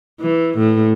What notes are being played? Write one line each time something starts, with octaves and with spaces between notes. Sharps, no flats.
E3
A2